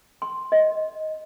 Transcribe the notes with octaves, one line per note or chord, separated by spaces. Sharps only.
C6
D#5